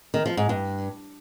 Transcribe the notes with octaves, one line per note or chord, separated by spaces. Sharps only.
D#3
F3
G#2
G2